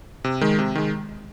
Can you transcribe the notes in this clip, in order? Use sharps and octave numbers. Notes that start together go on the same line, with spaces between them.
C3
D#3 G#3
C3
D#3 G#3